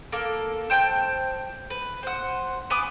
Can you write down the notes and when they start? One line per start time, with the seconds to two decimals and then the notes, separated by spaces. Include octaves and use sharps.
0.12 A#3 A4
0.70 C5 G5 A5 G6
1.70 B4
2.03 C5 F#5
2.70 B3 G#5 D6 D#6